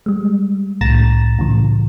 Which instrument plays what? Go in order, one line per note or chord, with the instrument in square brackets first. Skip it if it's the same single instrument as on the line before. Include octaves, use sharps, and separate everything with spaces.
[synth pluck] G3 G#3
C2 A2 A#5 A6 A#6 E7
A2 C#3 E3